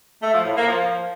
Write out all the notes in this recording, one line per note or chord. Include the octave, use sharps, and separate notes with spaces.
A3
F3
A2
A#3
F3